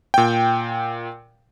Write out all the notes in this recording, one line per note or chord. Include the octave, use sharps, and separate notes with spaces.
A#2 G5